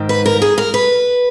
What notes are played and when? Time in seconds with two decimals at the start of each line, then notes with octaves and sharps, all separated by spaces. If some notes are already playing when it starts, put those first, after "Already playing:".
Already playing: G#2 D#3
0.09 B4
0.26 A#4
0.42 G#4
0.58 A#4
0.74 B4